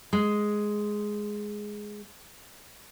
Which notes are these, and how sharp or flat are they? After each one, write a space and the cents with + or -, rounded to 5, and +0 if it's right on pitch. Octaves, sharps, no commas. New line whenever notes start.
G#3 +5